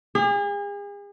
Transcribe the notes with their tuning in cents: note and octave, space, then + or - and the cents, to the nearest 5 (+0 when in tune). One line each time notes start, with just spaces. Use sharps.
G#4 -40